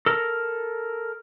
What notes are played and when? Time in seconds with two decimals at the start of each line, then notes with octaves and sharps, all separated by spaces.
0.06 A4 A#4